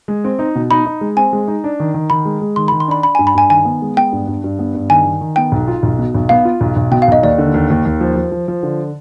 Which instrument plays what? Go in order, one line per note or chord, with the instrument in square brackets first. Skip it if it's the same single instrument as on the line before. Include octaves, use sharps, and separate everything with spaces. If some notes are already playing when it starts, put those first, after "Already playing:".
[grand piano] G#3
C4
D#4
B2
[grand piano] D#4 [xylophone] B5
[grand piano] D#4
G#3
[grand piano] C4 [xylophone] G#5
[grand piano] G#3
D#4
D4
D#3
D#3
[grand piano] D#3 [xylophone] B5
[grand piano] G#3
G#3
[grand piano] D#3 [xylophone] C6
[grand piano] D#3 [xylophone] B5
[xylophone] C6
[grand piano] D4 [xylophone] B5
[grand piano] D4 [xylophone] B5
[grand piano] G2 [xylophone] G#5
[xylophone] B5
[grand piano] G2 [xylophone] G#5
[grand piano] D#3 [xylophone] G#5
[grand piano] B3
G#3
[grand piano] B3 [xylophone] G5
[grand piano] G2
G2
G2
B3
G2
[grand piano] D#3 [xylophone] G#5
[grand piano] D#3
D#3
[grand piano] B3 [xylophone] G5
[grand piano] B1
F4
B1
B2
B1
[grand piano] B3 [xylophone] F5
[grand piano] F4
B1
B1
[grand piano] B2 [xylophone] G5
[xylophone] F5
[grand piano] B1 [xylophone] D#5
[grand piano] D#2 [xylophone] D5
[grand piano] D3
D#2
D#2
D#2
F3
F3
F3
F3
D3